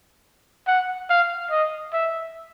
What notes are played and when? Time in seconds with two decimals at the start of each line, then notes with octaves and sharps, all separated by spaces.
0.67 F#5
1.10 F5
1.51 D#5
1.93 E5